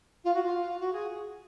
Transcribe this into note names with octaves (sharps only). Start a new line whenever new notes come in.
F4
F#4
F4
F#4
G#4